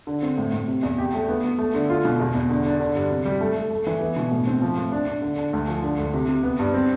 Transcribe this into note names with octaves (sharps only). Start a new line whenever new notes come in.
D3
C4
A2
A2
C3
E2
G4
A3
B3
B3
A3
D3
F4
B2
E2
E2
D3
D4
D3
G2
C3
G3
A3
A3
A3
E3
B3
B2
A2
C4
F3
A2
D4
D4
D3
D4
D2
F3
D3
D2
C3
C3
B3
G2
C4